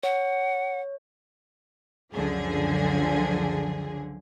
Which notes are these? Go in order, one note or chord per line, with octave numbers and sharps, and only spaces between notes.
C#5 F#5
C#2 F#2 D3 F3 G#4